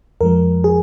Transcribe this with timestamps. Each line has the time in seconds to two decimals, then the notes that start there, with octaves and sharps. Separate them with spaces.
0.21 F2 F3 G#3 A#4
0.64 G#4